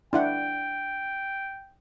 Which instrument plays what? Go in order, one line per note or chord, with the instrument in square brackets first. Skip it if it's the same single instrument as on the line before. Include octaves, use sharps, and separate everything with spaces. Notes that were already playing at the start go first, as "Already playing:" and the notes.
[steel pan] D4 E4 F#5 [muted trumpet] G5